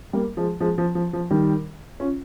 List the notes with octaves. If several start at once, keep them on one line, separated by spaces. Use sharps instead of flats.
G3 A#3
F3 G#3
F3 G#3
F3
F3
F3
D#3 G3
C#4 F4